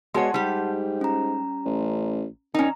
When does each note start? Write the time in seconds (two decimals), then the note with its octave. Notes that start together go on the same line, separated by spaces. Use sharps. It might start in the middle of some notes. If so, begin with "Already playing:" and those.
0.14 B2 G#3 C#5 F#5 A5 C6
0.34 G#2 G3 G4
1.01 C#4 A#5
1.66 A1
2.54 D#3 C#4 D#4 A#5